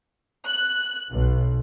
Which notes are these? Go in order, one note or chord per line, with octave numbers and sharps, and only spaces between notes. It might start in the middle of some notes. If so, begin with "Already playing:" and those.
F#6
B1